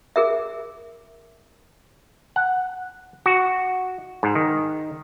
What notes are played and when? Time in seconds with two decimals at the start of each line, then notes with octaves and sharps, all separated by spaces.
0.16 G#4 A#4 E5
2.36 F#5
3.26 F#4
4.23 G#2
4.35 D#3